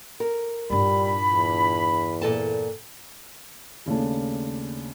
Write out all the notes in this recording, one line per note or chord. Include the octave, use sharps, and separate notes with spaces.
A#4
G2 A#2 G3 D4 E4 B5
E2
A#2 A4 A5
D#2 C#3 A3 D4